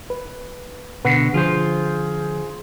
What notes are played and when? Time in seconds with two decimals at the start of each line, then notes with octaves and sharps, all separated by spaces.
0.10 B4
1.05 B2 D3 B4 F#5
1.34 D3 F3 F4 G#4 C5